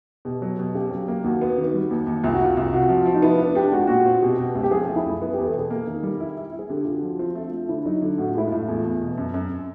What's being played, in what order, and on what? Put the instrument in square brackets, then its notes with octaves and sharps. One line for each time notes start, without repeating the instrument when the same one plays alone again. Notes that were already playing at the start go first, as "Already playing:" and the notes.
[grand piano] B2 [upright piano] G4
[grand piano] F#3
B2
[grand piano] C#3 [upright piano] G4
[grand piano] F#3
A#3
[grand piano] D#2 [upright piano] F#4
[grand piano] B3
D#3
G3
D#2
D#2
[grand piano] C2 [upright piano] F4
[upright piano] F#4
[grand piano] C2 [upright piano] F4
[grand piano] C2
[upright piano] F4
[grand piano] C3 [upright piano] F#4
[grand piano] F3
F3
[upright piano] D#4
[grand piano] B3 [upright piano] E4
[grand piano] D4
[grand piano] D4 [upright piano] G4
[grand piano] G#3 [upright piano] F#4
[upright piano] F4
[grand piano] A#2 [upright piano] F#4
[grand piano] C4
[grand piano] B2 [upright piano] G4
[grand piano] B2
C#2
[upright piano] G4
[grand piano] F3 [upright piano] G#4
[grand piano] A3
[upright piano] E4
[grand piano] F#2
B3
[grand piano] E2 [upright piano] G4
[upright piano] A4
[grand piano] B2 [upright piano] G#4
[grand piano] A#3
D#3
G3
E4
E4
E4
[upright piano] G#4
[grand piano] D3 [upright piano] G4
[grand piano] D3 [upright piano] F4
[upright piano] F#4
[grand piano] F3
[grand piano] C4 [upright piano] F4
[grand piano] A3
A3
[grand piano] D3 [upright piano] E4
[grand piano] F#3 [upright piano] D#4
[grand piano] D3
[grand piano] A2 [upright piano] F#4
[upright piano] F4
[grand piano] G#3 [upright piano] E4
[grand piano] A2 [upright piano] F4
[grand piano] E2
E2
B2
F#2
F#2